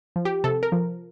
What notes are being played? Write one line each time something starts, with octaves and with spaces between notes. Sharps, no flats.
F3
G4
C3 A4
A#4
F3